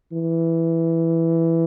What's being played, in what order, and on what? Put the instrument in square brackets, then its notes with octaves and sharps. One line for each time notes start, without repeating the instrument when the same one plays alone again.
[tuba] E3